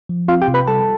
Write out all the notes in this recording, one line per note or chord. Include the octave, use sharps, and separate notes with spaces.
F3
C4 F4 F5
G4 G5
C3
B4 B5
G3 A4 A5